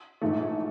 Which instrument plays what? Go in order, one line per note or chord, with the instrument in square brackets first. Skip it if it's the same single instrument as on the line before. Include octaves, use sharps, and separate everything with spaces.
[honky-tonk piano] A#1 G#2 E3 A3